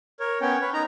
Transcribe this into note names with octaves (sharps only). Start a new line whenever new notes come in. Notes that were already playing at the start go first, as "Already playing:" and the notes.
A#4 C#5
B3 C#4 C#5 G5
B4 C#5
D#4 A#5